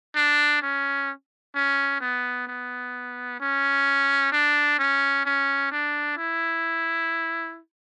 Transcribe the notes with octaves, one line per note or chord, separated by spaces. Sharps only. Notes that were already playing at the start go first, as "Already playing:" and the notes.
D4
C#4
C#4
B3
B3
C#4
D4
C#4
C#4
D4
E4